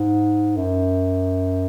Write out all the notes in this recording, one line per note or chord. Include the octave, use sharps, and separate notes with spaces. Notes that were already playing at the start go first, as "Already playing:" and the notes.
Already playing: G#2
F#2